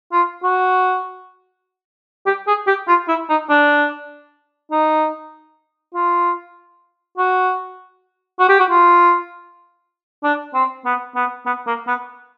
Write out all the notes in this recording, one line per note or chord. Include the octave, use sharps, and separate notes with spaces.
F4
F#4
G4
G#4
G4
F4
E4
D#4
D4
D#4
F4
F#4
F#4
G4
F#4
F4
D4
C4
B3
B3
B3
A#3
B3